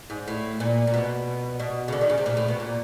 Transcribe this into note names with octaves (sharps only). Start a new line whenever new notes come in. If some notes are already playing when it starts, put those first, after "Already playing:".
G#2
A2
A#2
A#2
B2
B2
C#3
D3
D#3
C#3
C3
A#2
A2
B2
A#2